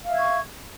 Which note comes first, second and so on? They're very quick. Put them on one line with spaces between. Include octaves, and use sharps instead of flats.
F5 E5 G#6 C#6